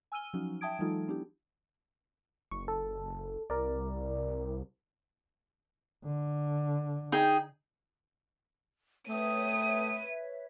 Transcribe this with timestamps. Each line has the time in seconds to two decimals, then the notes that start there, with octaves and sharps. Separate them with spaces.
0.12 G#5 E6 F6 D#7 G7
0.33 F3 F#3 C#4 D#4 F#4
0.61 E5 G5 A5 D#6 G#6 D7
0.79 E3 F#3 G#3 D#4 F4 A4
1.08 B3 D4 E4 G4
2.51 F#1 C#6
2.68 A4
3.50 C2 A#4 D5
6.05 D3
7.12 D#4 G#4 G5
9.09 A3 B4 C#5 E5 G5 D#6 D#7